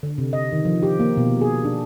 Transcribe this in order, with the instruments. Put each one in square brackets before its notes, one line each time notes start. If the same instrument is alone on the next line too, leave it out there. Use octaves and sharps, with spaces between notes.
[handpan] D3
C3
D#5
D#3
F3
G4
A#3
B2
G#4
D4